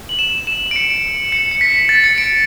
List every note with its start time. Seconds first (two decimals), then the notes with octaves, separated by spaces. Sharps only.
0.09 F#7
0.19 E7
0.47 E7
0.71 D7
0.76 C#7
0.90 D7
1.32 C#7
1.51 C#7
1.61 B6
1.89 A6
2.04 C#7
2.18 D7